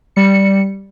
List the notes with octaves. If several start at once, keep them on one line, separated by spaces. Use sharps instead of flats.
G3 C#7